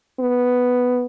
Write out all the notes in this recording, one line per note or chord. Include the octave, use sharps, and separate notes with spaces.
B3